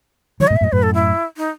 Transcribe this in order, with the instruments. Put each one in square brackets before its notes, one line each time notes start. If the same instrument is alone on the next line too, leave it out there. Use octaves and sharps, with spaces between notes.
[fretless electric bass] D#3 F#3 [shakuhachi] C#5
[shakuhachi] D#5
[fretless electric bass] G#2 B2
[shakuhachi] E5
[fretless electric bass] F#2 A2
[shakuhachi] D#5
[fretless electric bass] F#2 A2 [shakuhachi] B4
[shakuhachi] A4
E4
D#4